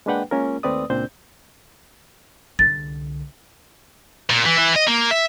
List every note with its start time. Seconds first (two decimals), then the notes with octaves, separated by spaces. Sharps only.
0.06 G#3 A#3 D4 B4 F#5 G5
0.31 G#3 A#3 C#4 F4 A#4
0.63 D#2 A3 C4 B4 D5 D#6
0.90 C#2 A#2 C4 D4 C5 G6
2.59 C2 D3 A6
4.30 A#2
4.46 E3
4.59 E3
4.76 D#5
4.88 A#3
5.11 E5